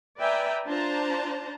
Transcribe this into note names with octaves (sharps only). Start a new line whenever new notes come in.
B4 D5 E5 G5 G#5 A#5
D4 F4 C5 A5 A#5